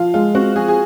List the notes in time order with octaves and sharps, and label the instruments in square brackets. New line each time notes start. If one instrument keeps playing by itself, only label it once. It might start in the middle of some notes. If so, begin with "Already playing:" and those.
Already playing: [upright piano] F3 [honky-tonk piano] F4
[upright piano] G#3 [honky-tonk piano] F4
[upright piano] C4 [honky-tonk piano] F#4
[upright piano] F3 [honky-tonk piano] G#4
[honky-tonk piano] G#4